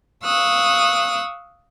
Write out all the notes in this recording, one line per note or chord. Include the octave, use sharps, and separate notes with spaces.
F5 C#6 D#6 E6 F#6